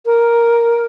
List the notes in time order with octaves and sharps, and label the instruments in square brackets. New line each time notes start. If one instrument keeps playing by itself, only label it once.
[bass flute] A#4